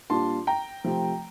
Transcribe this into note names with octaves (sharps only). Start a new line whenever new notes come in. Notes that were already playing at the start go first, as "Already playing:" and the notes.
A#2 G3 D4 F4 A5 C6
G5 A#5
C3 F3 A3